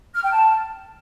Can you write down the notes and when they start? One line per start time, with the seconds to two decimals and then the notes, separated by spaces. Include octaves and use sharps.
0.14 F6
0.23 G5
0.32 A5